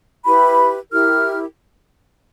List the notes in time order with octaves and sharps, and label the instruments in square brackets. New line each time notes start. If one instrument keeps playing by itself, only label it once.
[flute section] E4 G4 B4 B5
E4 G4 A#4 F6